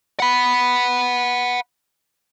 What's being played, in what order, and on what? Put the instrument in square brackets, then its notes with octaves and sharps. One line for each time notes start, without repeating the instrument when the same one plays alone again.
[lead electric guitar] F#5 B5